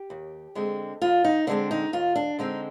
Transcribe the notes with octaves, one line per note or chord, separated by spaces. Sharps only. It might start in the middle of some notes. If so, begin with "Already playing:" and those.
Already playing: G4
D#2
D3 G#3 C4
D#2 F4
D#4
D3 G#3 C4 D4
D#4
D#2 F4
D4
D3 G#3 C4 D#4